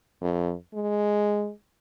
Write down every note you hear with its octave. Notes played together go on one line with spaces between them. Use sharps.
F2
G#3